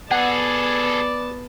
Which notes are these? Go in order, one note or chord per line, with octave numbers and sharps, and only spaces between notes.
B3 G#4 A4 D5 F#5 A5